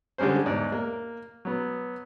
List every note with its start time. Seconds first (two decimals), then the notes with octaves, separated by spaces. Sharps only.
0.18 D3 G3 G#3 C#4 C5
0.46 E2 G#2 D5
0.72 A#3
1.45 F#3 B3